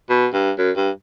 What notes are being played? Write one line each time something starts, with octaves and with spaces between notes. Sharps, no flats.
B2
G2
F#2
G2